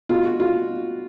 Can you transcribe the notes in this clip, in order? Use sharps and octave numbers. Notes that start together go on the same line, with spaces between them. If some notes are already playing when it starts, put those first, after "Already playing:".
B2 F4
F#4
B2 F4